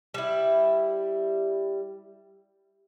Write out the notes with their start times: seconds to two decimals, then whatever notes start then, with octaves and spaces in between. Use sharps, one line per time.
0.14 G3 E4